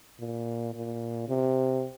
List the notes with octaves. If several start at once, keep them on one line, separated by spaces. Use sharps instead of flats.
A#2
A#2
C3